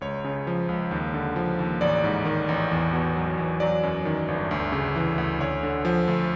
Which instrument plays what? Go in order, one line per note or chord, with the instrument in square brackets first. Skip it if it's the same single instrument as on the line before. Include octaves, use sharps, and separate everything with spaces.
[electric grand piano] C#2 C#5
C#3
F3
C#2
D#2
D3
F3
D#2
A1 D5
G#2
D#3
A1
E2
B2
F#3
E2
F#3 D5
F#2
D#3
G1
D2
C#3
E3
D2
D2 C#5
D3
F3
D2